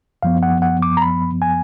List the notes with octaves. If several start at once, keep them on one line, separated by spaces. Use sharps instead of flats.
F#2 F3 B3 F5
F#5
F#5
D6
A#5
B5
G#5